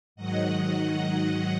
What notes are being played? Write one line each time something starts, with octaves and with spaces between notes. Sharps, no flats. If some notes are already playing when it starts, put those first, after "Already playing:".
G#2 D#3 F#3 D#5 F#5